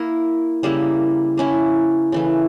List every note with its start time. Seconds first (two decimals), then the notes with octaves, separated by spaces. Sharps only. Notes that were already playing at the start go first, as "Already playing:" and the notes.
Already playing: A#3 E4 A#4
0.63 C#3 G3 A#3 E4
1.37 A#3 C#4 E4
2.12 C#3 E3 A3